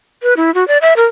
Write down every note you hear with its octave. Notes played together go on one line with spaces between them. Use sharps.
B4
E4
F#4
D5
E5
A#4